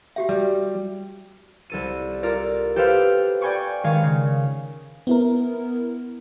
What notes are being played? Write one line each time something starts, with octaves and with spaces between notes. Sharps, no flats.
F#4 G4 E5
G3
C2 A4 D#7
F4 A4 A#4 D5
G4 A4 B4 C5 F5 B5
D5 G5 G#5 B5 C#6 D6
D#3 G#3 G#4 D#5 F5 C#6
C#3
B3 E4 A#4